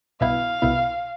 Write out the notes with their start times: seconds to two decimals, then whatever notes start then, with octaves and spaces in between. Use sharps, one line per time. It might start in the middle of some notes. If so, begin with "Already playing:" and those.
0.21 C2 B2 B3 E4 F5
0.62 C2 B2 B3 E4